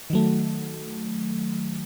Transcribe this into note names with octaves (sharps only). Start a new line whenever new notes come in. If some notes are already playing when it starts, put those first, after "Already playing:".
D#3 F#3 A3